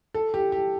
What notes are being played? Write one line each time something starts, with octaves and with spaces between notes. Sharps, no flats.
A4
G4
G4